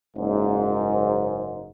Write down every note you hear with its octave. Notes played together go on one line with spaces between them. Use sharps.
F#1 G#2